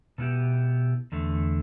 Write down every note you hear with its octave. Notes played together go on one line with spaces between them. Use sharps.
B2 B3 E4 G4
E2 D3 A3